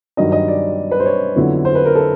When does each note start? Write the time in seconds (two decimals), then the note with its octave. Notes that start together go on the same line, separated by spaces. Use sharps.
0.17 G2 D#3 F#3 D#5
0.32 D#5
0.48 D5
0.91 B4
1.00 C5
1.06 C#5
1.35 F2 D3 F#3 B3 E4
1.65 C5
1.75 B4
1.85 A#4
1.95 A4